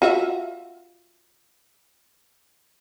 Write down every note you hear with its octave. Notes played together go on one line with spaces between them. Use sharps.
F4 F#4 E5